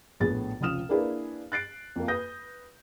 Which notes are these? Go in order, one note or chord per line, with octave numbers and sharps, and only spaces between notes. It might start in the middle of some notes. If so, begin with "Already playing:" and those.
A#1 A2 B3 G#4 A6
F1 C#2 F3 D#6 F6 E7
A#3 D4 E4 G#4 A#4 B4
F#6 A6 C7 D7
F2 A#3
B4 D#6 G6 A#6